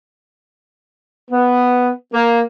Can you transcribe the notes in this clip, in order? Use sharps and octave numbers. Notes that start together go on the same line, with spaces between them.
B3
A#3